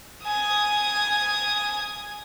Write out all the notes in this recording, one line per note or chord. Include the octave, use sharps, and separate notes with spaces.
G#5 D#6